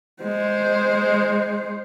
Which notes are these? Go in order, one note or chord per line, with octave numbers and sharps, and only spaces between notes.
G#3 C5